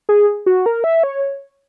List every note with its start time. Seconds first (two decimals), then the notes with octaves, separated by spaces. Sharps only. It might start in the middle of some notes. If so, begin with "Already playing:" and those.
0.09 G#4
0.46 F#4
0.66 A#4
0.84 E5
1.03 C#5